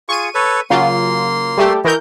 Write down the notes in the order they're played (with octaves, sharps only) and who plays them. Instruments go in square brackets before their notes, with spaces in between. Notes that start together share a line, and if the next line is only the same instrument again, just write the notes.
[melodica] F4 G#4 [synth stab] C#6 D#7
[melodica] A4 B4 C#5
[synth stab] C#3 F#3 F4 [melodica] A#3 C6
[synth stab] G3 A3 G4
[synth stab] E3 A#4 G6 [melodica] F#4 D#5